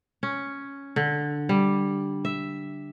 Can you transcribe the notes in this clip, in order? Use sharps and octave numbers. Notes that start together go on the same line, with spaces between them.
C#4
D3
G3
E5